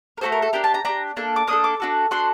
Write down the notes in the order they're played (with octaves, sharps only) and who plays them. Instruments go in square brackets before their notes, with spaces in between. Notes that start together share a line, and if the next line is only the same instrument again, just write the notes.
[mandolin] A#4
A3 D#4 F#4 A4 C5
A#4
A4
D4 G4 A#4
A5
A#5
D4 G4 A#5
A#3 D4 A4
D6
A#3 D4 A4 D#6
D6
D4 F#4 A4
D4 F#4 A4 C6